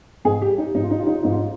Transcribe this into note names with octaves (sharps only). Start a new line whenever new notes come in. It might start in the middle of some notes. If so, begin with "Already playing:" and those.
G#2 G#4
G4
G3
D#4
G#2 D#4
F4
D#4
G3 F4
D#4
F4
G#2 D#4
F4
D#4